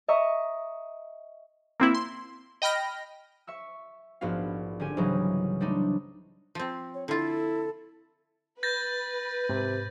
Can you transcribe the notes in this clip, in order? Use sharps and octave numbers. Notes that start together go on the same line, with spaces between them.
D#5 E5 A#5 C#6
A#3 C4 E4
C6
D#5 G5 B5 F6 A#6
E5 C#6 E6
A#1 G#2 B3 F#4 F5
D3 C4 C#4 G4 G#5
C2 G#2 C#3 E3 F#3 G#3
G3 A3 C4 D4 D#4
F3 C4
C#5
D3 E4 F4 A4
B4 G6 A6 A#6
G#2 C3